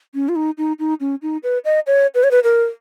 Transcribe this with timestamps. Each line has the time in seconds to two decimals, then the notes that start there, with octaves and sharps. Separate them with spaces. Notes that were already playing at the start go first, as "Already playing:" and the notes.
0.14 C#4
0.29 F4
0.36 D#4
0.58 D#4
0.79 D#4
1.00 C#4
1.22 D#4
1.43 B4
1.65 D#5
1.87 C#5
2.15 B4
2.24 C#5
2.31 B4
2.44 A#4